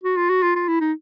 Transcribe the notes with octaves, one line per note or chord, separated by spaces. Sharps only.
F#4
F4
F#4
F4
F4
E4
D#4